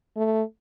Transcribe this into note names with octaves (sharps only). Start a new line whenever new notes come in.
A3